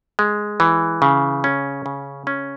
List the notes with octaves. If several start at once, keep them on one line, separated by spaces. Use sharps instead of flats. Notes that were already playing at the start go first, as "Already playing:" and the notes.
G#3
E3
C#3
C#4
C#3
C#4